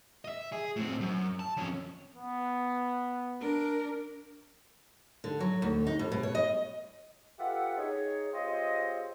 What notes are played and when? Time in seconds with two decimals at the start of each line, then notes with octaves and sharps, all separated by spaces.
0.25 D#5 E5
0.52 G#4
0.76 A2 C4
1.00 F#2
1.39 A5
1.57 F2 C#4
2.16 B3
3.40 D4 A#4
5.24 D3
5.40 F#3
5.62 D2
5.87 D#4
5.99 F2
6.12 B2
6.23 C#5
6.35 D#5
7.39 F4 G4 A4 B4 E5 F#5
7.78 D#4 G#4 C#5
8.33 C4 F4 G4 G#4 C#5 D#5